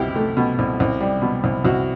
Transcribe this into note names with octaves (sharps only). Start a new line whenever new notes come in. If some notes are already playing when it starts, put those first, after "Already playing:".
Already playing: C2 B2 E4 G4
A3
B2
C2
C2
G3
B2
C2
C2 F#4